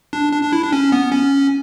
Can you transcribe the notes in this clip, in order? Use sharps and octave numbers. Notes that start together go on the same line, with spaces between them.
D4
D4
D4
E4
D4
C#4
B3
C#4